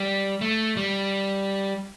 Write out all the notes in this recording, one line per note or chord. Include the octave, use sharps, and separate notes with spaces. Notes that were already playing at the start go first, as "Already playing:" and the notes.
Already playing: G3
A3
G3